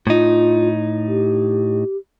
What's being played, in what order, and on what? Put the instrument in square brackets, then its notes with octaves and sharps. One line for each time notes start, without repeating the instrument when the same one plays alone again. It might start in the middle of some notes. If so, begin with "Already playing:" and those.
[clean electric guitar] A2 D#4 [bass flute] F4
[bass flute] G4